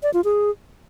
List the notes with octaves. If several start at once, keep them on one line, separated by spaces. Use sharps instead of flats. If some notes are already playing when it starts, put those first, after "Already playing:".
D5
F4
G#4